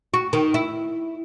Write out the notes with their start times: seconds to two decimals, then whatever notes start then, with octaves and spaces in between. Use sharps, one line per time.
0.14 F#4
0.33 D#3
0.54 E4